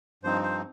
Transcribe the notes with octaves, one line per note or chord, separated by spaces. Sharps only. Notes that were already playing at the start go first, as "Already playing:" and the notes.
G2 F3 C4 D#4 C5
C5